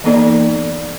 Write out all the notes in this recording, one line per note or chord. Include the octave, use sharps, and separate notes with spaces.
E3 A#3 B3 D#4 A4 D5